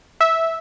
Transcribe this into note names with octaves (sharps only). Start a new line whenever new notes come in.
E5